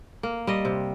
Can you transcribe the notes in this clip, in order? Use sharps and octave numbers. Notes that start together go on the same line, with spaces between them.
A#3
G3 D#5
C3